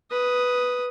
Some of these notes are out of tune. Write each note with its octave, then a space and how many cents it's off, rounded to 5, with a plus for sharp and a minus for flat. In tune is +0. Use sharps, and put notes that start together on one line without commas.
B4 +0 D#6 +0